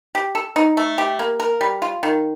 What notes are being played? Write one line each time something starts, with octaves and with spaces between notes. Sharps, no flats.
G4
A4
D#4
A3
G4
A#3
A#4
G3
F4
D#3